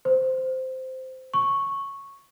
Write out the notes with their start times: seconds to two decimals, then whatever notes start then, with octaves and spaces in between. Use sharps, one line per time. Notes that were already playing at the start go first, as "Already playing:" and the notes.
0.05 C5
1.34 C#6